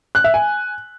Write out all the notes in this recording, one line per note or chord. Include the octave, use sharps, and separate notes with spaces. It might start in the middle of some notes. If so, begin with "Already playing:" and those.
F#6
E5
G#5